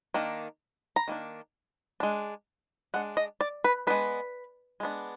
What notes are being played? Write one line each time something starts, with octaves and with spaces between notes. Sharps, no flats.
D#3 A#3 D4
A#5
D#3 A#3 D4
G#3 D4
G#3 D4 F#5
D#5
D5
B4
G#3 B3 D4 B4
G#3 B3 D4